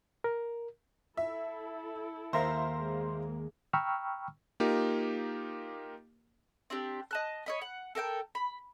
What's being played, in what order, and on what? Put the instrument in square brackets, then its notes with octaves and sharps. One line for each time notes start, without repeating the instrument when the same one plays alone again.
[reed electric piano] A#4
[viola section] E4 A4 [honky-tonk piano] E5
[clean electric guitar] D#2 A#4 [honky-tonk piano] C5 E5 F5
[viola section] G#3 A#3
[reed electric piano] G5 A#5 B5 C#6 E6 F6
[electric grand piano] A#3 D#4 F4 G4 A#4
[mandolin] C4 D4 G4
D#5 A5 F#6
C#5 D#5 B5
F#5
A4 A#4 F#5 G5
B5